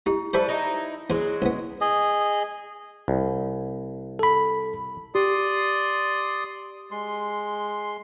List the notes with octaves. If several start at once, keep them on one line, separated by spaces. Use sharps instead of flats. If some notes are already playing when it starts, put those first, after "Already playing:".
D#4 E4 G4
G3 G4 A4 B4 C5 D5 E5
D#4 E4
E2 F#3 G#3
C2 B3
G#4 D#5
C2
A4 B5
G4 D5 C6 D#6
G#3 C6